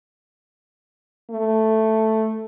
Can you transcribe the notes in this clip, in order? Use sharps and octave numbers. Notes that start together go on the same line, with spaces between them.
A3